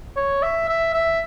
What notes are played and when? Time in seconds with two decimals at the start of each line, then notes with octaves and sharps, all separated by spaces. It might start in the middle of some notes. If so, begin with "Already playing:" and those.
0.16 C#5
0.43 E5
0.69 E5
0.94 E5